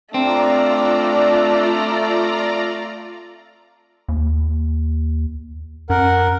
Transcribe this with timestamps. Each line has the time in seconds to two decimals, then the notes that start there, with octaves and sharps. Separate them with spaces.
0.14 A3 C4 D4 F4 D5 A#5
4.08 D#2
5.90 F#2 A#4 F#5